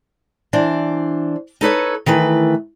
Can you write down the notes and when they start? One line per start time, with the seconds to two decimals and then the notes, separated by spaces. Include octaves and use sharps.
0.53 E3 D4 C5
1.61 D#4 A4 B4 C#5
2.06 D#3 E3 A3 B4